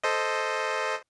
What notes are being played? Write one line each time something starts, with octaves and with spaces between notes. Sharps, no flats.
A4 C5 D#5